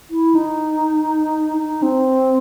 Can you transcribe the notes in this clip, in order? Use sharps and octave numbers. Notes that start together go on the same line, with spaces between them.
E4
D#4
D#4
C4